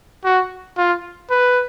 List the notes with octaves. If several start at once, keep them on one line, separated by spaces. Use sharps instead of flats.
F#4
F4
B4